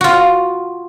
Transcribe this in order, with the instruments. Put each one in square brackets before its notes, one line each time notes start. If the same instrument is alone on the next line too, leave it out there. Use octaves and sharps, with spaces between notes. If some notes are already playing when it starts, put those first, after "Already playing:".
[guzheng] F4 F#4